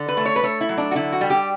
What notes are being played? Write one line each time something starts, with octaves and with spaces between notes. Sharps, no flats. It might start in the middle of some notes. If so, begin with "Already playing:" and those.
Already playing: D3
B4
A3
C#5
B4
A3 C#5
E4
F#3
D4
F#4
D3 E4
F#4
G3
G4